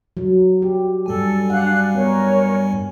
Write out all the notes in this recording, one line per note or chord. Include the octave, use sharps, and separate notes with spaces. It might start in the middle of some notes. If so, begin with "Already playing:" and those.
F#3
G4
G2 G3 A4 G#5
D4 F5 F#5 F#6
B3 A#4 C#5